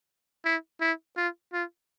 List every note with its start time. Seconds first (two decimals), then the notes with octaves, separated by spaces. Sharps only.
0.45 E4
0.81 E4
1.17 F4
1.53 F4